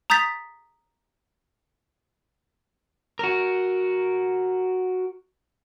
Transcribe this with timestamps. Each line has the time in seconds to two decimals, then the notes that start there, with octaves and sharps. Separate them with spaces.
0.10 A#5 D#6 G6 A6 B6
3.19 F#4 A#4